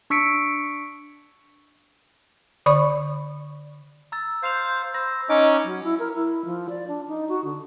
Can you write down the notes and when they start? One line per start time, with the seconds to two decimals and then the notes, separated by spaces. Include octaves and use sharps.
0.10 D4 C#6 E6 B6 C#7 D7
2.66 D3 D5 B5 C#6
4.12 A#5 E6 A6
4.43 C5 F5 G6 F7
4.94 C5 B5 E6 A#6
5.29 C#4 D#4 D6
5.63 F#3
5.84 E4
5.99 A#4
6.14 E4
6.45 F3
6.69 D5
6.88 D4
7.08 D#4
7.29 F#4
7.45 D3